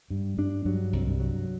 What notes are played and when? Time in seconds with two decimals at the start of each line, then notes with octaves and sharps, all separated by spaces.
0.10 G2 G3
0.38 G2 D4
0.65 G2 F#3
0.93 C2
1.07 G2
1.20 F#3